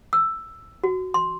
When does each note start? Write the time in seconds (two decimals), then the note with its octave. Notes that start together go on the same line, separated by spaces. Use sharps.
0.13 E6
0.84 F#4
1.14 C6